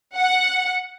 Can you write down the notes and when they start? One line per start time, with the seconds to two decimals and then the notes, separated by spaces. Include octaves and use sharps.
0.16 F#5